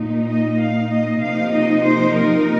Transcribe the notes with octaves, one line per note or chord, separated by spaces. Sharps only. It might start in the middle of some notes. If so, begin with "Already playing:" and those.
Already playing: A#2 A#3 D#4
D#5
F5
D#5
C3 F3 A#3 D#4 F5
D#5
C5
A#4